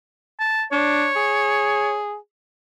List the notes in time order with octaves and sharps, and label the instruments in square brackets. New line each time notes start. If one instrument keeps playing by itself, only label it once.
[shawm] A5
[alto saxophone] D4 [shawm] C#5
[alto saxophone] G#4